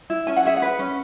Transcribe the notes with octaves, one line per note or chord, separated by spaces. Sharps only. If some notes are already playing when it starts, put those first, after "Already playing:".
E4
C#4 G#5
F#5
G#4 E5
F#5
B4
C#4